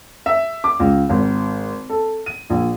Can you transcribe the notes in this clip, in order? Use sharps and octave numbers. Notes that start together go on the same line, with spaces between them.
E5
D6
C#2
G#1
A4
D#7
A#1